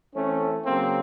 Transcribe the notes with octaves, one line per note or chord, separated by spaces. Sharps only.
E3 A3 C4 C#4
C#3 F#3 A#3 C4